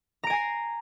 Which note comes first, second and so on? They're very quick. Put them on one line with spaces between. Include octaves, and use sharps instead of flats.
A#5 D7 G#5 C7